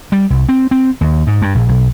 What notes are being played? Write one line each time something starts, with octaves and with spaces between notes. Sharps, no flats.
G3
C2
C4
C4
D#2
G#2
G2
A#1
B1